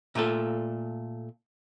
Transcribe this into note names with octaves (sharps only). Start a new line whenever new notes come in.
A#2 A3 F4 A4